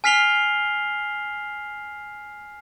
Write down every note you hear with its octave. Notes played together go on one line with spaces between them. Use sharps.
G#5 F6 B6 C7 F7 G7